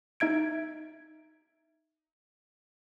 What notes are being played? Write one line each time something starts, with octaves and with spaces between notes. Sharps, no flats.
D#4 E5 G#6 D7